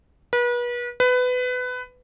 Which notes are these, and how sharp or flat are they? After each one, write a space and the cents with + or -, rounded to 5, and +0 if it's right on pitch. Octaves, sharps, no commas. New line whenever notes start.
B4 -35
B4 +20